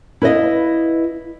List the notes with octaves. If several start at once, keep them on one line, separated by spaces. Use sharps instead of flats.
E4 B4 C#5 D#5 F5